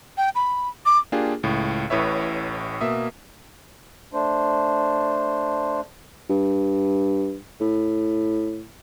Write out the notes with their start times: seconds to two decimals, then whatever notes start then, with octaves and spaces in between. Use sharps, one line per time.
0.17 G5
0.35 B5
0.86 D6
1.12 A#3 D4 F4 G4 G#4
1.43 C#2 A2
1.90 A1 A2 B4 C#5 E5
2.81 B2 A#3 E5 D#6
4.13 A3 D4 C5
6.30 G2
7.61 A2